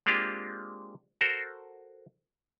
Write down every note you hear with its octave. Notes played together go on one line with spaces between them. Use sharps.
G#3 A#3 C4 D4 F4 G4
F#4 A4 A#4 C5